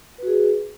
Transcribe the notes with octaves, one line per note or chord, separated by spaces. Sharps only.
F#4 G#4 B4